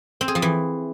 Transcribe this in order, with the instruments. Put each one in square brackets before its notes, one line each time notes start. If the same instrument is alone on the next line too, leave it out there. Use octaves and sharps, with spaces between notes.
[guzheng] C4
G#4
F3
E3